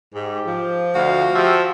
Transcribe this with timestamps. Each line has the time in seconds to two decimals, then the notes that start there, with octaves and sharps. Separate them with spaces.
0.15 G#2 G4
0.48 F3
0.95 D2 F#4 F5
1.35 F3 G4 E5 G5